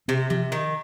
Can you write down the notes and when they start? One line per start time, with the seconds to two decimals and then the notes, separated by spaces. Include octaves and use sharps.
0.08 C3 C4
0.30 C3 F3
0.52 D#3